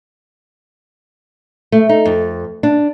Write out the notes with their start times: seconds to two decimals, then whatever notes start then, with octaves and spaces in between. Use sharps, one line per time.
1.72 A3
1.89 D#4
2.05 F2
2.63 D4